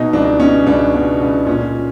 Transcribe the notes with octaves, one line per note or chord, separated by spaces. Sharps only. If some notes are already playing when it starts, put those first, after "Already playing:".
Already playing: B2 D#4
C#2 D4
B2 C#4
C#2 D4
B2
C#2
A#2 C#4